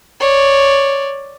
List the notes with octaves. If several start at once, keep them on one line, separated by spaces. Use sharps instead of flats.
C#5 D5